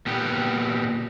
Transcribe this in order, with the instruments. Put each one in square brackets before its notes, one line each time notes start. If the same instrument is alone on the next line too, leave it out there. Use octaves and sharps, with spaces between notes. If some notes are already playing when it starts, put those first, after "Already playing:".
[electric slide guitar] A#2 B3 G4